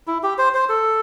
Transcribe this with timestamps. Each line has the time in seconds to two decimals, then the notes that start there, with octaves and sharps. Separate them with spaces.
0.07 E4
0.23 G4
0.38 C5
0.54 C5
0.69 A4